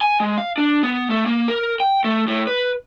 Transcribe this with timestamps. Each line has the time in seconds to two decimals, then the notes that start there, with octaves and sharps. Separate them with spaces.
0.01 G#5
0.20 G#3
0.38 F5
0.58 D4
0.83 B3
1.10 A3
1.26 A#3
1.48 A#4
1.80 G5
2.04 A3
2.27 A2
2.47 B4